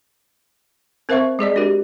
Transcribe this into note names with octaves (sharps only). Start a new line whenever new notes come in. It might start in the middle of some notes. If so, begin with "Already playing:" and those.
C4 A#4 C5 E5 F5 C#6
G#3 G#4 D5 D#5
D4 F#4 G4 A#4